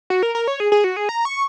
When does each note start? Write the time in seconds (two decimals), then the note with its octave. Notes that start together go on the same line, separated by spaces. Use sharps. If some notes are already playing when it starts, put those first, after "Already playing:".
0.10 F#4
0.23 A#4
0.35 A#4
0.48 C#5
0.60 G#4
0.72 G#4
0.84 F#4
0.97 G#4
1.09 A#5
1.25 C#6